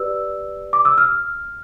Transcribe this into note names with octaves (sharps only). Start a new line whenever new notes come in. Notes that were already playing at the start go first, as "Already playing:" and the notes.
Already playing: G4 B4 D5 E6
D6
E6
F6